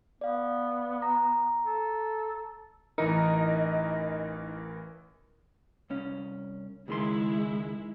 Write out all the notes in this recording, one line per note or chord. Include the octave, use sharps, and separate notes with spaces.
B3 D5 F5
A#5 A#6
A4
A1 E3 D#4 A#4 D#5
C2 C#4
C#2 D#3 G#3 E4 C6